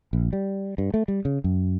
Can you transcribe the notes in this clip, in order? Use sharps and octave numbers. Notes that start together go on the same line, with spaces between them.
A#1
G3
G2
A3
G3
C#3
F#2